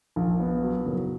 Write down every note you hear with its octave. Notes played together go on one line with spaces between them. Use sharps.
A#1
B3
F#3
F#1